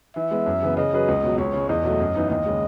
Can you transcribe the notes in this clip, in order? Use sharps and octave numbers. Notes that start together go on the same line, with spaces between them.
E3 E5
G#3 B3
F#2
C#3 E3 B3
C#3 D#5
F#3 C#4 G#4 B4
C#2
B2 F#3
C#2 C#5
C#3 G#3
E2 D#5
B2 F#3 A3
F#2
E3 B3 D#4
D#2 D#5
C#3 G#3